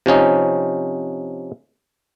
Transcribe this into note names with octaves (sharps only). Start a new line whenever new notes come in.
C3 F3 C#4 D#4